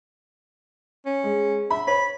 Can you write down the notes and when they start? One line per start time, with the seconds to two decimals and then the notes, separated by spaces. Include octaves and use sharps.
1.06 C#4
1.24 G#3
1.70 E5 B5
1.87 C#5 B5